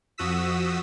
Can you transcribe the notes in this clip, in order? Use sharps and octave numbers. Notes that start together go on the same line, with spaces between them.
F2 F3 F#4 D#6 E6 B6